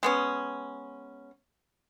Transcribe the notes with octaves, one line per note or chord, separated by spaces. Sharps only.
G#3 B3 C#4